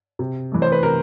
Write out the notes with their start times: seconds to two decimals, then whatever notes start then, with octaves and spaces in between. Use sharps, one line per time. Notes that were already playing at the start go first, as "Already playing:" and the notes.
0.19 C3
0.52 E3 A3
0.62 C5
0.72 B4
0.83 C3 A#4